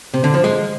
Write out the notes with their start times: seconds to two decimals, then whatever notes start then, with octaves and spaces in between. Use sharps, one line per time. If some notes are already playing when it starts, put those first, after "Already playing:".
0.14 C3
0.24 D3
0.34 F3
0.44 G#3